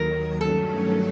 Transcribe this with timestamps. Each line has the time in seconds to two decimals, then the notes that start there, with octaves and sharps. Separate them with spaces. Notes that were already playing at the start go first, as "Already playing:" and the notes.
Already playing: D#2 D#3 F#3 A#4
0.41 G2 D#3 F#3 A3 C#4 A4